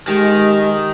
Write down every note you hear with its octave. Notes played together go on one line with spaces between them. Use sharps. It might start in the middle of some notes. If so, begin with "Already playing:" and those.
D#3 G#3 G4